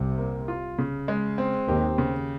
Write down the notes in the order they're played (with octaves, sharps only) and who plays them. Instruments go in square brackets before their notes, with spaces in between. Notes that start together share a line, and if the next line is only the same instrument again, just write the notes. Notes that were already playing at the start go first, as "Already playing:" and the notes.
Already playing: [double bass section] C2 C3
[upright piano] A#3
F4
C#3
G#3
C4
[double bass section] D#2 D#3 [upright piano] G4
[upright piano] C#3